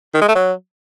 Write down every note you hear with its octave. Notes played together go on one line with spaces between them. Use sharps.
D#3
G#3
A3
F#3